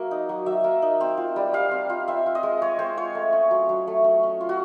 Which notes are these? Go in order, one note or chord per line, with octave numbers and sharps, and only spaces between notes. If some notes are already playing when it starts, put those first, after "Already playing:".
Already playing: F#3 A#3 E5
D#4
F#3
F#3 E5
A#3
D#4
C4
F4
G3
G3 F5
C4
F4
C4 E5
F4
D#5
G#3
G#3 C#5
C4 C5
F4 C#5
A3
C#4
F#3
F#3
A3
C#4
C#4
F4
F#4